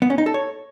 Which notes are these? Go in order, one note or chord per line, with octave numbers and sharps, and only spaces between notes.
B3
C#4
D#4
A4
C#5